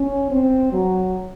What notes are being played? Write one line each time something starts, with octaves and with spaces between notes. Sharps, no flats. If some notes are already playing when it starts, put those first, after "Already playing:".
Already playing: C#4
C4
F#3